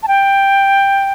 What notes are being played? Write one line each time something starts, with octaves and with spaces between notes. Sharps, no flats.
A5
G5